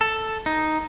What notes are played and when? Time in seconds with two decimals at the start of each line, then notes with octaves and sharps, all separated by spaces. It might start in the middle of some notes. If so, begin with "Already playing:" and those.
0.01 A4
0.46 D#4